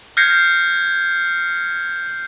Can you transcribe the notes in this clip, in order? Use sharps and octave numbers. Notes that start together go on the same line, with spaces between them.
F6 G6 G#6 A#6 C7 C#7